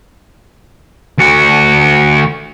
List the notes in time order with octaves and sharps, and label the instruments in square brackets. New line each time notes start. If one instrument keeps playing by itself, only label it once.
[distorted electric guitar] D2 F#4